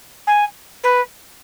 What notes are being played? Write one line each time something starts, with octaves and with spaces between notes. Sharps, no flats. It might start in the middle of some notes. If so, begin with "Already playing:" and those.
G#5
B4